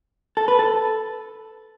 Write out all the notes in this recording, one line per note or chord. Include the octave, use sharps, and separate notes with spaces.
A4
B4
A4